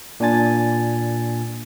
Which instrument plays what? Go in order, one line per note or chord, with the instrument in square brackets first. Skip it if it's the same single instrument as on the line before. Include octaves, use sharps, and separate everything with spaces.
[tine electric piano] A#2 D4 G#5 A6